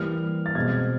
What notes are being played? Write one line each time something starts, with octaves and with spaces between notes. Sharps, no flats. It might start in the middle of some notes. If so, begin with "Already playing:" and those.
Already playing: E3 G3 A#3 F6
A6
B2 G#3 C4 G#6